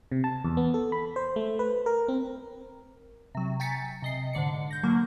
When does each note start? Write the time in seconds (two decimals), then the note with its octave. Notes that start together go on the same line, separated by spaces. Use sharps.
0.12 C3
0.24 A5
0.44 E2
0.57 B3
0.74 A4
0.92 B5
1.16 C5
1.36 A3
1.59 B4
1.86 A#4
2.08 C4
3.35 C3 F#3
3.60 G5 G#5 A#5 A6 B6 C#7
4.02 C3 D#5 C7
4.33 G#2 D3 D5 C#7
4.71 G6 A#6
4.83 D3 E3 F#3 A#3